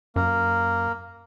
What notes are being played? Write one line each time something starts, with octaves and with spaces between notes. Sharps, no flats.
F#2 A#3